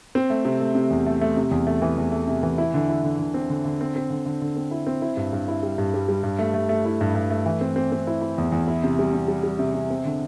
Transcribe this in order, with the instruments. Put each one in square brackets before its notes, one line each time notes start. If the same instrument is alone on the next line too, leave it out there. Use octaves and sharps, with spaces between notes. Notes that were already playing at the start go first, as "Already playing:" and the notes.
[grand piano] C4
A3
C3
A3
C3
E2
A3
A3
C3
E2
A3
E3
E2
A3
C3
E3
E4
D3
E4
D3
D3
C4
D3
D3
C4
C4
D3
D3
D3
C4
E4
C4
E4
G2
G2
E4
G3
G2
G3
G3
G2
A3
A3
A3
E4
G2
G2
A3
E3
C4
C4
C4
E4
E4
E2
E2
E4
C3
G3
C3
G3
G3
C3
C3
C4
D3